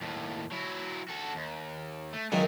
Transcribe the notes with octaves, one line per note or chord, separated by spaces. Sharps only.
D#2 A2
F#3 E4
F#4 A4
D#2
A3
C#2 F#2 D#3 F#3 A3